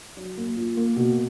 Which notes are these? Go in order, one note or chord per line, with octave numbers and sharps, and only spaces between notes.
F#3
A#3
F4
A#3
B2